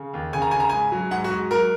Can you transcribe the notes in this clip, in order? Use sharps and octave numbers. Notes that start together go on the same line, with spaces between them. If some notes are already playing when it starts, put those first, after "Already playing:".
Already playing: C#3
D#2
C#3 G#5
A#5
C#3 G#5
A#5
G#2 G#5
F#3
G#2 F#5
F#4
G#2
F#3 A#4